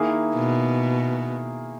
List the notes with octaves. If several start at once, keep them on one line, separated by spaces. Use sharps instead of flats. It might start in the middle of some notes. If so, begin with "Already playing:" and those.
Already playing: D#3 A#3 E4 G#4
B2